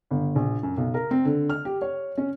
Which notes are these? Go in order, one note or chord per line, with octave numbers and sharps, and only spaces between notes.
G1
A#1
F#2
B1
A#4
C4
D3
F6
G4
C#5
C#4